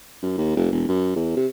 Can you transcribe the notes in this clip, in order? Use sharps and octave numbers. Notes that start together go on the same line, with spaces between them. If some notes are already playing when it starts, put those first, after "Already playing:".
F#2
D#2
F1
E1
F#2
E2
C3